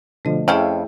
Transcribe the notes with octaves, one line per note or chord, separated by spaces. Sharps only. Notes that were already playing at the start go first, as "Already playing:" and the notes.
B2 D3 F3 A3 D#5
F2 C#4 E4 G#4 E5 F5 G5